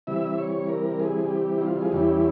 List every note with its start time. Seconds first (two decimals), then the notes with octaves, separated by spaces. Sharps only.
0.07 C3 E3 G3 E5
0.38 C#5
0.69 A#4
1.00 G#4
1.30 G4
1.57 E4
1.62 F4
1.82 G#4
1.92 E2 E3 G3 C#4 E4 G4